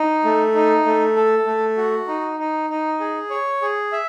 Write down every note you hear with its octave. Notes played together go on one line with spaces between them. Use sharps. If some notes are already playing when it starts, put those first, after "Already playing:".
Already playing: D#4
A3
D#4
A3
A4
A3
F#4
D#4
D#4
D#4
G#4
C#5
G#4
E5